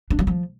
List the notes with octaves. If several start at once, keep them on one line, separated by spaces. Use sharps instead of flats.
D4
F#3
F3